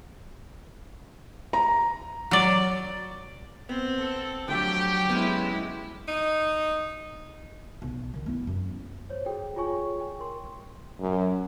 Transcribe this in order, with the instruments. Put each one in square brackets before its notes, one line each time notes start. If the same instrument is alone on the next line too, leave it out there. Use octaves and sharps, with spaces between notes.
[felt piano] A#5
[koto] F#3 D5
[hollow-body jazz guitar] B3 [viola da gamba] C4
[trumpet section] A4
[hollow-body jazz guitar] D3 F3 A3 [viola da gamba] F#3 [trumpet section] G4 [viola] G5
[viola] G#3 E4 [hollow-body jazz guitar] B3 C#4
[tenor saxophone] D#4
[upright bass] B1
D#3
B3 E4
F#2
[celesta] C5 C#5
F#4 G#4 A4 G5
F4 G#4 C#5 G#5 C#6
G5
A#4 C6
[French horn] F#2